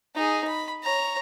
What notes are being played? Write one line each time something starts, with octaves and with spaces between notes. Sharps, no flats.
D#4 G#4
B5
C#5 A#5